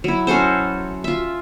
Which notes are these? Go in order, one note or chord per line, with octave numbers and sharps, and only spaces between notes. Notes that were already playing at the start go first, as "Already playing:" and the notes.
F#3 E4
C#4 F#4 A4 C5
F4 E5